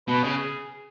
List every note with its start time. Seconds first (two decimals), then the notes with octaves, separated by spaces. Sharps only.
0.08 B2 B4
0.23 C#3 G#4